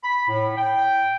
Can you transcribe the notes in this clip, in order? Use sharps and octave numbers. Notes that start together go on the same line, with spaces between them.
B5
A2
G5